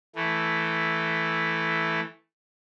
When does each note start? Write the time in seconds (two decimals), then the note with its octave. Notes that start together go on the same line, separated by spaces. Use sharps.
0.15 E3 A3